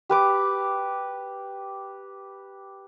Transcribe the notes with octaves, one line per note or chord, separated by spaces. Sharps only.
G4 B4 D6